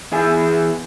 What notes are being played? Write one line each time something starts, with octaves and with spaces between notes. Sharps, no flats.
E2 E4 G#4 G#5